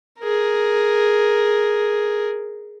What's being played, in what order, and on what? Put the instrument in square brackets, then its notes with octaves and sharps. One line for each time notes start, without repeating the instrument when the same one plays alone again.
[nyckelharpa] G#4 A#4